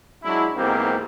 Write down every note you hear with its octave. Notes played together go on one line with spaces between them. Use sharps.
F#3 G#3 D4 E4
B1 G#2 E3 A#3 C4 G4